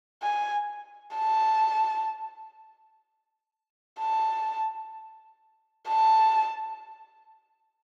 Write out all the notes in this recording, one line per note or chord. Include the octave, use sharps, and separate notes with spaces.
G#5
A5
A5
A5